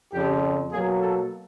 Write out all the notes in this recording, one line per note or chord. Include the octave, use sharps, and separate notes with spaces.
F2 C#3 F3 G4
B2 F#3 A#3 G#4
A4